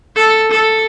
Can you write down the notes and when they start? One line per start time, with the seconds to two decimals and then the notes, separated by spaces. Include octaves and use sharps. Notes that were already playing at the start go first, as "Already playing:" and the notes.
0.16 A4
0.51 A4